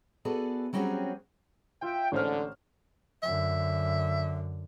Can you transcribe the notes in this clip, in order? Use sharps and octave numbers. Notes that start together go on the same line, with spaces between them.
B3 F#4 G#4 A4 D5
F#3 G3 C4 C#4 F#4 G#4
F4 E5 G5
A1 G#2 D3 C5 F6
F#2 D3 E5